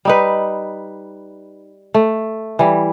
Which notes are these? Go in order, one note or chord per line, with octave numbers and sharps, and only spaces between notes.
G3 D#4 B4
A3
E3 G3